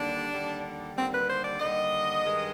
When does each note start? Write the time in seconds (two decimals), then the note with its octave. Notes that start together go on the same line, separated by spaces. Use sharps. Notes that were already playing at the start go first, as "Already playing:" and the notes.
Already playing: D#2 D3 G3 D4
0.32 D#2 D3 G3
0.96 D#2 D3 G3 C4
1.12 B4
1.28 C5
1.43 D5
1.60 D#2 D3 G3 D#5
2.23 G2 D#3 G#3